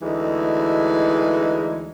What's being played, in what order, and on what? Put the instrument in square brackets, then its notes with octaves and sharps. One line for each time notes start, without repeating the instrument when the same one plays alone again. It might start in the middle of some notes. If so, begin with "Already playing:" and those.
[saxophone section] D2 E3 G#3 D#4